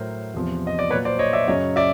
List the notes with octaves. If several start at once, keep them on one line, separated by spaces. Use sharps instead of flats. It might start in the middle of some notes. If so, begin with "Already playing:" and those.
Already playing: A2 F#3 A#4 C5
E2 C3 F3
D#5
D5
A#2 F#3 B4 C#5
C5 D5
C#5 D#5
D5 E5
F#2 C#3 F#3 C#5 D#5
D5 E5